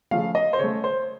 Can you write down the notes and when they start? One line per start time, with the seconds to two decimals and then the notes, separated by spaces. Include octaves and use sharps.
0.11 C#3 F3 A3 F5
0.35 D#5
0.53 C5
0.59 C#3 A3 C#5
0.84 C5